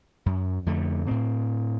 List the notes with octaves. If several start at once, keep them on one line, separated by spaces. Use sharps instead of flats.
F#2
F2 D3 A3
A2 C4